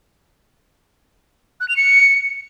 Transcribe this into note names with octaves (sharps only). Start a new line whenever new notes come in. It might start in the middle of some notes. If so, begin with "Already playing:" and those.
F#6
F7
C#7